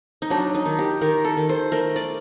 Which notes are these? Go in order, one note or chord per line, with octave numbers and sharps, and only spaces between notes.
D#4
F#3 D4
D#4
D#3
G4
D#3 A#4
A4
D#3
C5
A3 A#4
D5